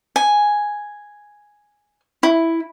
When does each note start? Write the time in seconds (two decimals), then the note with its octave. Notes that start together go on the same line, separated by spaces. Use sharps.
0.16 G#5
2.23 E4